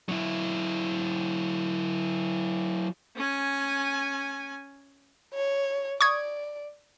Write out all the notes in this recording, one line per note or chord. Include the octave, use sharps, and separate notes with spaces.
F#3 E4
C#4 G#5
C#5
D5 C#6 D#6 G#6